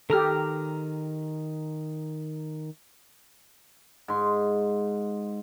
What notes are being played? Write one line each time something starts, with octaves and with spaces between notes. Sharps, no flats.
D#3 G4 A4 A#5 F6
G#2 C6